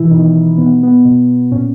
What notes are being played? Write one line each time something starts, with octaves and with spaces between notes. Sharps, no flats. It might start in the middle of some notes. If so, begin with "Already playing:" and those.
Already playing: B2 E3 E4
B2 D#3 D#4
B2 B3
B3
B2
A#2 C#4